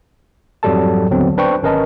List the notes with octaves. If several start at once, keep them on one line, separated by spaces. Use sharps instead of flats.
F2 G#2 F#3 G3 A4 A5
D#2 D3 F#3 B3 C4
D4 B4 C5 G5 C#6
G#1 C#4 A#4 B4 D#5 A5